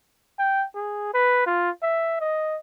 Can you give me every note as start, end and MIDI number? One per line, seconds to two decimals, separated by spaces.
0.39 0.65 79
0.75 1.09 68
1.14 1.44 71
1.46 1.70 65
1.82 2.18 76
2.20 2.57 75